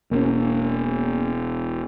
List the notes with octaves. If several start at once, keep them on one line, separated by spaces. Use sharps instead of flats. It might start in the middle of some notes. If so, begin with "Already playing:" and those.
E1 A#3 C#4